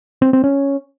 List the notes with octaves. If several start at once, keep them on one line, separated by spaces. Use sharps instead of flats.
C4
C4
C#4